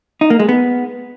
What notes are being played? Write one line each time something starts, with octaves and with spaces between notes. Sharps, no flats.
D#4
A#3
G#3
B3